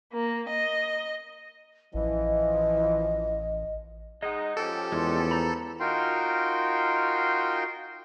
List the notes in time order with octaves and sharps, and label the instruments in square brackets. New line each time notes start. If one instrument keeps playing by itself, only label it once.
[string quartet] A#3
D#5
[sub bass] A1 [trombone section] E3 F3 [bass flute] D#5
[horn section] G#3 D#4 [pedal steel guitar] D#5 F#5
[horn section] F3 C#4 G4 [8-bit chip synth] A4
[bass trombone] E2 [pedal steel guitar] G#3 C6
[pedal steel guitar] C5 A#5 B5
[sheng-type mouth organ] D#4 F4 F#4 A#4 G5 C6